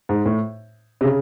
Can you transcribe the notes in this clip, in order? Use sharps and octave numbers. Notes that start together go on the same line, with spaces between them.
G#2
A2
C3
C#3